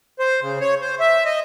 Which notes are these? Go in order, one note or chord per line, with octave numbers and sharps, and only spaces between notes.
C5
C#3
C#5
C5
E5
D#5